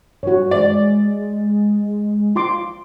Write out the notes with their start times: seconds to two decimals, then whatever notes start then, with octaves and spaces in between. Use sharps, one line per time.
0.23 G2 F#4 C#5
0.51 G#3 D5
2.36 F4 C6 D6